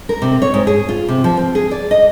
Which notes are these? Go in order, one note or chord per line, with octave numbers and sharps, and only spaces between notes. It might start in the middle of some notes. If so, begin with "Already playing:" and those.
A#4
C3
C#5
G#2
G#4
F4
C3
F3
C4
G#4
D5
D#5